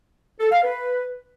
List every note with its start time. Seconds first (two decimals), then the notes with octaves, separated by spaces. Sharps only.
0.40 A4
0.52 F5
0.64 B4